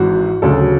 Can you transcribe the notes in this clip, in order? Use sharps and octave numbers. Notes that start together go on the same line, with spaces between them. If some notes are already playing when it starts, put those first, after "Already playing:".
Already playing: G#1 G#2 E3 F#4
D2 C#3 F#3 A4